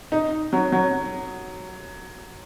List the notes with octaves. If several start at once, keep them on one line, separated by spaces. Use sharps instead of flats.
D#4
F#3
F#3